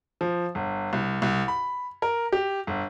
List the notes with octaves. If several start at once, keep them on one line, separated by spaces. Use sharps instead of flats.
F3
G1
C2
C2
B5
A#4
G4
G1